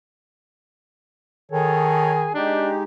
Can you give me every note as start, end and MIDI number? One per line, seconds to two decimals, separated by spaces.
1.51 2.33 51
1.51 2.31 68
1.51 2.12 69
1.51 2.12 73
2.34 2.84 56
2.34 2.72 62
2.34 2.84 63
2.34 2.84 67